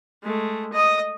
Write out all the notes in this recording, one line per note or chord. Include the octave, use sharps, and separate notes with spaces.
G#3 A3
D#5 D#6